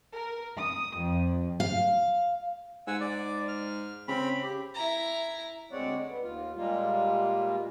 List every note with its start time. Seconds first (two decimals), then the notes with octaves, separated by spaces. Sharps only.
0.13 A#4
0.58 D#6
0.99 F2
1.60 F5
2.87 G#2 F#5 G#5 E6
3.00 D5
3.48 F6
4.08 C#3 C4 B5
4.42 G4
4.74 E4 A#5
5.72 D2 G#3 C4 C#5 D5 F#5
6.08 B3
6.23 D#2 F4
6.56 A#2 G3 G#3 A#3 F4